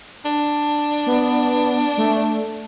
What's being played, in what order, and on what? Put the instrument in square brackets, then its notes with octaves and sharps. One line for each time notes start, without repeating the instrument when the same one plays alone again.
[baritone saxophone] D4
[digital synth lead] B3
A3